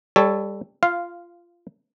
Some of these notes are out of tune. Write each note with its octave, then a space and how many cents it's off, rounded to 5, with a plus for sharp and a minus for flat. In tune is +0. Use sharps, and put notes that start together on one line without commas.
G3 +20 A4 +0 C#5 +5
F4 -15 F5 +0